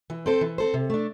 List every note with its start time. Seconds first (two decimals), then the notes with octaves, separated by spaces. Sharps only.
0.10 E3
0.26 C4 A4 C5
0.41 E3
0.58 C4 A4 C5
0.74 C3
0.90 A3 D4